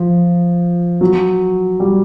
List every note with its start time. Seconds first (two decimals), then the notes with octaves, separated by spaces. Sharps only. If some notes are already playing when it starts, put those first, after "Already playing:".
Already playing: F3
1.01 F#3
1.80 G3